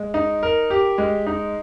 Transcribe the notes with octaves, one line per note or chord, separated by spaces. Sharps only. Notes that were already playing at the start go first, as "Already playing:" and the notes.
Already playing: G#3
D#4
A#4
G4
G#3
D#4